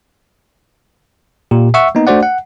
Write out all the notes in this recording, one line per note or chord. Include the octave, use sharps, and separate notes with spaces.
A#2 G4
E5 F#5 C#6 E6
A#3 B3 D#4
A3 D4 F#4 C5 D5 F#5
F#5